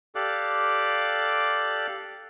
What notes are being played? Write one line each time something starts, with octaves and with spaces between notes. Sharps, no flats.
G4 A4 D5 F5 D6 F#6